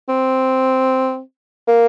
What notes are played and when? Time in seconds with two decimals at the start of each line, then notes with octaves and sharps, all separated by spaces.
0.09 C4
1.68 A#3